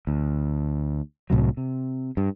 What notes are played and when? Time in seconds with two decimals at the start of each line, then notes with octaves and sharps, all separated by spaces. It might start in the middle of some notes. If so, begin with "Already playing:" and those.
0.07 D2
1.30 C2 A2 C3 F#3
1.57 C3
2.17 G2